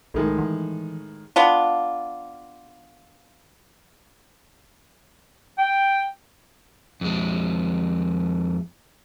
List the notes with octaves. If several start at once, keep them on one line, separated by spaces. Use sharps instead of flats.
B1 A2 D#3 G#3
E3
B3 D4 F4
G5
F2 G#3